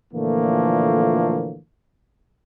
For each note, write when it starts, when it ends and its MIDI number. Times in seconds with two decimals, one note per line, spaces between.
0.14 1.59 46
0.14 1.59 50
0.14 1.59 52
0.14 1.59 53
0.14 1.59 57
0.14 1.59 58